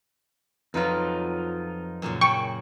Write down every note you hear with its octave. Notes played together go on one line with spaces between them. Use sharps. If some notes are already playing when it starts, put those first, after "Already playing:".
F2 F#3 D#4 F4 B4
F#2 A#2 C#3
F#2 F#4 G5 C#6